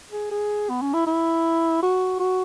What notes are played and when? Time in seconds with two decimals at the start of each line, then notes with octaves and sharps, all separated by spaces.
0.12 G#4
0.31 G#4
0.69 B3
0.82 C#4
0.94 E4
1.07 E4
1.83 F#4
2.20 F#4